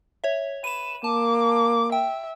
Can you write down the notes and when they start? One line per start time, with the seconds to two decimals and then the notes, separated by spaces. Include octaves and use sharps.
0.24 C#5 E5
0.64 B4 D#7 E7
1.04 A#3 A5 D6
1.92 E5 G5